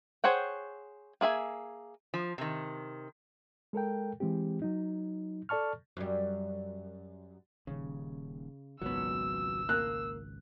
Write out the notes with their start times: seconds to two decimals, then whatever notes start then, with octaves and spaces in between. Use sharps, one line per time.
0.24 G#4 C5 C#5 F#5 G5
1.21 A#3 G#4 E5 G#5
2.14 F3
2.38 C3 D#3
3.73 G#3 A4 A#4 G5
4.20 E3 G#3 C4 G4
4.62 F#3 D#4
5.49 A4 D5 A5 C#6 F6
5.97 F#2 G3
7.67 D#1 D#2 C#3
8.82 G#1 C#2 A#2 F#3 B3 E6
9.69 A#3 F#6